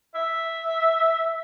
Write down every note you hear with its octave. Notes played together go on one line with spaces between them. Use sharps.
E5